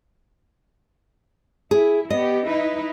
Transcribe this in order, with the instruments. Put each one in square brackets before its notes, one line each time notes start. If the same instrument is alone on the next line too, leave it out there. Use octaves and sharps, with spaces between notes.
[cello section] E4 [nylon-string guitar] G#4
[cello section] B3 G4 [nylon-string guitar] D#5
[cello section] D#4 E4 B4